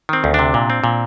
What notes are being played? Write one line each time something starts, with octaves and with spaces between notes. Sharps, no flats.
D#3 C4
D2
C3 D4
A#2
C4
A#2